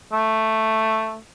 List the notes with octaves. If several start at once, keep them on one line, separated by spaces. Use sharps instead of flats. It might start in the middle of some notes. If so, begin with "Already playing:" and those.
A3